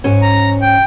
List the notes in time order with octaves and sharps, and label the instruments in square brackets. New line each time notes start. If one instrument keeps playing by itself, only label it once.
[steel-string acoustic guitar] G#2 C#4 G#5
[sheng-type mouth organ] A#5
G5